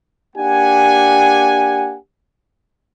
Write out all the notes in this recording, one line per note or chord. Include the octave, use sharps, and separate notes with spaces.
A#3 D4 G4 F#5 G#5